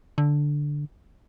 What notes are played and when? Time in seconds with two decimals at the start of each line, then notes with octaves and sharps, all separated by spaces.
0.18 D3